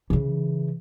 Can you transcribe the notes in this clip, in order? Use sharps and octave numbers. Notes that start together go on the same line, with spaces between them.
C#3 E3